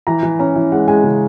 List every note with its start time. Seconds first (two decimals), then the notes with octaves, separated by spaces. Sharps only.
0.07 E3 A#5
0.23 E3
0.39 C#4 A#5
0.56 E3
0.72 G#3 F#5
0.88 G#3 G#5
1.04 C#3